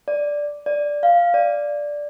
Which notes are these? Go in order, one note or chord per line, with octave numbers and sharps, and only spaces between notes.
D5
D5
F5
D5